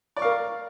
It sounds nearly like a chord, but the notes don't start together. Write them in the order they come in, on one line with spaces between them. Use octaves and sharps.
D5 C#6 F5 A#4